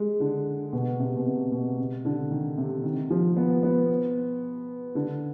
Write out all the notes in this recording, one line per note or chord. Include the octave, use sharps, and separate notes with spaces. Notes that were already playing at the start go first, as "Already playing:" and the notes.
Already playing: G#3
D3
B2
C3
B2
C3
B2
C3
D3
D#3
C3
D#3
F3
B3
B3
D3